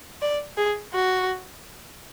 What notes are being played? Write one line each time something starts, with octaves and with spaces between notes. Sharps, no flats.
D5
G#4
F#4